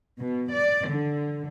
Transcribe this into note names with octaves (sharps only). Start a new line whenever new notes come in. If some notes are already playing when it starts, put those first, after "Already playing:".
B2
D5
D3